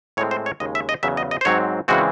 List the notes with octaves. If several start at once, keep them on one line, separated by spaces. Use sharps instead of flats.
A2 G#3 C4 C#5
C5
C#5
D#2 C#3 G#3 D#5
E5
D#5
E2 C#3 F#3 E5
D#5
D#5
C5
G#2 F#3 C4 C#5
C#3 E3 G#3 C4 F#4